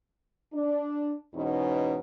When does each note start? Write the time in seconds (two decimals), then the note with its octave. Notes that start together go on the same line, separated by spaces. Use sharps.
0.54 D4
1.35 E2 G#2 B2 C#4 D#4